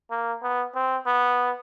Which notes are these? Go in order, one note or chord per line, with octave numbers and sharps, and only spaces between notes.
A#3
B3
C4
B3